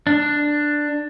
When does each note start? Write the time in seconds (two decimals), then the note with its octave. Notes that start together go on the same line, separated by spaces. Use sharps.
0.07 D4